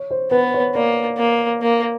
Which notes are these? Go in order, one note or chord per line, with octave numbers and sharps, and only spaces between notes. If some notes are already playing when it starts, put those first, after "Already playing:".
Already playing: C#5
C5
B3 B4
C#5
A#3 D5
A#3
A#3